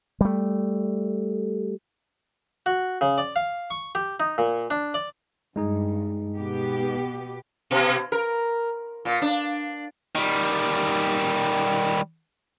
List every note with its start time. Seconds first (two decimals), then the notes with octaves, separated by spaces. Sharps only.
0.21 G3 A3
2.66 F#4
3.01 C#3
3.18 D5
3.36 F5
3.70 C#6
3.95 G4
4.20 D#4
4.38 A#2
4.70 D4
4.94 D5
5.56 G2 G#3 D#4 G#4
6.37 B2 B3 G4
7.71 B2
8.12 A#4
9.05 A#2
9.22 D4
10.15 D#3 G3